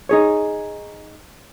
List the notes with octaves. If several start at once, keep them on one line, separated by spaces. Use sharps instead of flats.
D#4 G#4 C#5